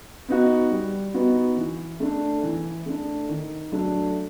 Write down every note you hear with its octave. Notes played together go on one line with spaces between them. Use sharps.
B3 D#4 F#4
G3
B3 D#4 F#4
E3
A3 D4
E3
A3 D4
D#3
F#3 A3 D4